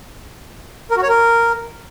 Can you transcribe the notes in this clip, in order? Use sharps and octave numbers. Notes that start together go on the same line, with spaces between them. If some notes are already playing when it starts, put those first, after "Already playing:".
A#4
F#4
C#5
A#4